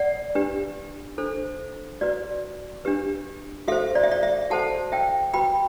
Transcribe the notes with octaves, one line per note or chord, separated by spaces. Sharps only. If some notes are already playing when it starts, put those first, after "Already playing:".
Already playing: D5 F#5
D4 G4 B4
D4 A4 C5
F#4 B4 D5
D4 G4 B4
F#4 A4 C5 E5
D5
E5
D5
E5
F#4 A4 C5 F#5 A5
E5 G5
F#4 B4 G5 B5